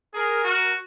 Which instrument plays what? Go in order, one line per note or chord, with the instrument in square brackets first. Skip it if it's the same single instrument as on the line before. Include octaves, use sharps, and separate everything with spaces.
[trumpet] G#4 [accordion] A#4
[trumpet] F#4